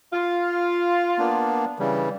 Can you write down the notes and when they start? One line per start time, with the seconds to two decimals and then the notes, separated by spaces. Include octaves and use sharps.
0.13 F4
1.18 A#3 B3 D4
1.79 C#3 E3 G3